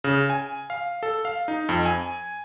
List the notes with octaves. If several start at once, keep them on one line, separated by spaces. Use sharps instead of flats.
C#3
G#5
F5
A4
F5
D#4
F2
G#5